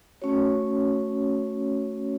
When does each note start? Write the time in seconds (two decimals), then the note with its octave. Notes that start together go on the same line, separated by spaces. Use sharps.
0.22 A3 C#4 F#4 C#5